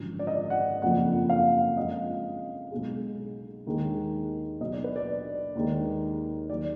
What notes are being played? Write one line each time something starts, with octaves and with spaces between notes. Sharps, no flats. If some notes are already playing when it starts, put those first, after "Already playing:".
Already playing: G#1 F#2 D3 F3
D5
D#5
D5
F#5
F#1 F2 F3 F#5
F5
F2 F3 G#3 D#5
B1 B2 G#3
D#2 D#3 G#3
B1 B2 F#3 D#5
D5
B4
D5
D#2 D#3 G#3
D#2 D#3 F#3 D5